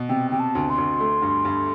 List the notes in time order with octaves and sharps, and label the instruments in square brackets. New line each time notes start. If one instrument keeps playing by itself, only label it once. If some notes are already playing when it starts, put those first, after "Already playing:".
Already playing: [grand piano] B2
[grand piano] C3 [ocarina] G5
[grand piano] C3 [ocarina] G5
[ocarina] A5
[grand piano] D2
[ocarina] C6
[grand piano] D2
A3
G2
G2